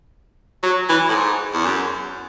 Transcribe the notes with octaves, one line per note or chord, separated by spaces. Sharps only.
F#3
E3
A2
G#2
E2
F#2